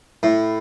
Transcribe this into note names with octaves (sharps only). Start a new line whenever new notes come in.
A2